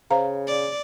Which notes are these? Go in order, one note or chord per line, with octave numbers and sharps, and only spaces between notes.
C#3 C5 F5 A#5
D5